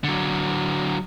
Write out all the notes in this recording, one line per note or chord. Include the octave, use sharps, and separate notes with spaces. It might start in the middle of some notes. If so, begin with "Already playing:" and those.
D3 F#3